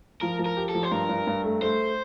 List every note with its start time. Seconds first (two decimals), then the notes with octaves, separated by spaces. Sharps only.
0.21 F3 A#4
0.39 F3
0.46 A#4
0.57 G4
0.69 A4
0.75 F3
0.83 C5
0.91 G2 A#4
1.09 G2
1.27 G2
1.44 A3
1.62 A3 C5